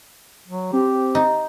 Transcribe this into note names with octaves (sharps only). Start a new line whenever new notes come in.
F#3
C4 G4
D#4